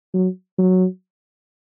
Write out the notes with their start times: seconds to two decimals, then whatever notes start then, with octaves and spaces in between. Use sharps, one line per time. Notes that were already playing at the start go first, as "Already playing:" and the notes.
0.14 F#3
0.58 F#3